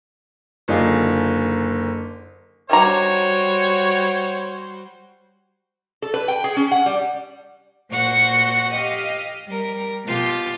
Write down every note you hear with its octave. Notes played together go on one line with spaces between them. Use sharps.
F#1 D3 D#4 F4 G#4
D#3 G3 D4 F#4 C5 C#5 A#5
A4
B4
G5
G#4
C#4
F#5
G3
A#2 F#4 C5 F#5 C#6
G4 D#5 F5
G3 A#4
B2 F4 G4